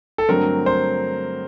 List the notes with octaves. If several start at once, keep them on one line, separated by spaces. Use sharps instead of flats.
A4
G2 D3 F#3 A3 C4 A#4
C5